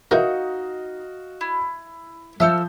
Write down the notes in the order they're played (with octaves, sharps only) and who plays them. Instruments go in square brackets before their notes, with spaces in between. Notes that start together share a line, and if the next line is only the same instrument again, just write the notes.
[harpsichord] E3 A#4 [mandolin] D#4 G6 [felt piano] F#4 D#5 F5
[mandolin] E4
[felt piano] F3 G6 [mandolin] A4 E6 F6 [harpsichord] E5